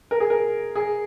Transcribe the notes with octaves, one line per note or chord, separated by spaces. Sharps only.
A#4
G#4
A#4
G#4